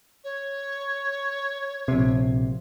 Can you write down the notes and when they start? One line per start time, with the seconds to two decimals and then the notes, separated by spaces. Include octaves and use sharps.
0.24 C#5
1.88 A#1 C3